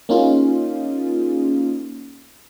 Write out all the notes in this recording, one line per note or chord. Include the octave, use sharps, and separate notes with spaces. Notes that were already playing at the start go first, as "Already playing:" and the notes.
A#3 C#4 D#4 F4 G#4